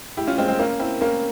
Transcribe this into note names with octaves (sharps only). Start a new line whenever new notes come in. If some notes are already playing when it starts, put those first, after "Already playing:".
E4 G4
C#4 F4
G#3 C4
G#3 C4
A#3 C#4
C4 E4
A#3 C#4